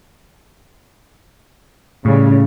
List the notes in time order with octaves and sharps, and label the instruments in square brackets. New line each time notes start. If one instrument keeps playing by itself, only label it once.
[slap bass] A2 [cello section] C#3 G3